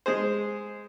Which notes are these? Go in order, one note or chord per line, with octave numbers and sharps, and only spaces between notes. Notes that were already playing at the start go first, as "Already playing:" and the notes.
G#3 G#4 C5